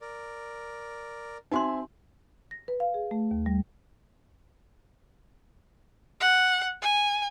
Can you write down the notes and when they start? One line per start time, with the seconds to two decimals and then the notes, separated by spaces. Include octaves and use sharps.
0.01 A#4 D5
1.52 C4 D#4 F#4 E5 G#5 C6
2.51 A#6
2.68 B4
2.80 F5
2.94 G#4
3.11 A3
3.31 D#2
3.46 G3
6.20 F#5
6.82 G#5